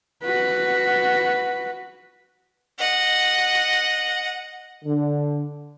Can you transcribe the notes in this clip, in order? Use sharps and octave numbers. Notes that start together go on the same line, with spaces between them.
F#4 B4
D#5 F#5
D3